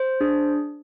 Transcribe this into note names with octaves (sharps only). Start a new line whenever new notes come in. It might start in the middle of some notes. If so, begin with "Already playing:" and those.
Already playing: C5
D4 G#4